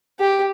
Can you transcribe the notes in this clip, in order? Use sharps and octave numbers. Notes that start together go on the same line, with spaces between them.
G4